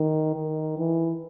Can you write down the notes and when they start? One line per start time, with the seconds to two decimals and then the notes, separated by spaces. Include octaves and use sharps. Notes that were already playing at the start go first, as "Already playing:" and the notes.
Already playing: D#3
0.36 D#3
0.78 E3